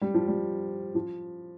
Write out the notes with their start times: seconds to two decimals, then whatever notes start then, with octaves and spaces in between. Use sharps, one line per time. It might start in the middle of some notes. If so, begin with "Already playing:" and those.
0.02 G3
0.14 F3
0.28 G3
0.95 F3